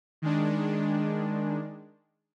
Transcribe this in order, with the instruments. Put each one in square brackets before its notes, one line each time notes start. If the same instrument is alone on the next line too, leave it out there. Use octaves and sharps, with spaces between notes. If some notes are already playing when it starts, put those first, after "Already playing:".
[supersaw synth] D#3 G#3 D4